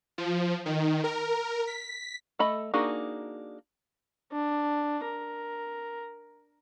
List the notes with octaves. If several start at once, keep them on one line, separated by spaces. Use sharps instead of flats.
F3
D#3
A#4
B6
A3 A4 D#5 B5
A#3 D4 D#4 F#4 G#4
D4
A#4